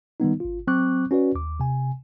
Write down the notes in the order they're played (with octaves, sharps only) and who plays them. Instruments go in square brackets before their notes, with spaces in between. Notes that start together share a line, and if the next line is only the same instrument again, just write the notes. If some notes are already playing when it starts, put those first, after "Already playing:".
[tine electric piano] D#3 G3 B3 D#4
G#1 F4
F#3 C4 C#6 D6 F#6
C#4 F#4 B4 D5
D#2 D6
C3 G#5